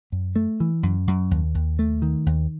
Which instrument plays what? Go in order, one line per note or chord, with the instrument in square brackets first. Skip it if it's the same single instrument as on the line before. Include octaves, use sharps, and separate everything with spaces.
[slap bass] F#2
A3
E3
F#2
F#2
D#2
D#2
A3
D#3
D#2